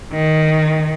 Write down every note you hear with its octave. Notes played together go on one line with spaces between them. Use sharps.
D#3